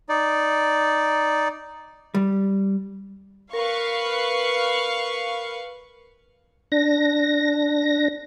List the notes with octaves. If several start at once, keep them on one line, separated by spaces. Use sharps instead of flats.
D#4 D5
G3
A#4 B4 F5 C#6
D4 A#6